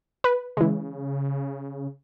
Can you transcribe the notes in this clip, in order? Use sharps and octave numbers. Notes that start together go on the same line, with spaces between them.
B4
C#3 E3 G#3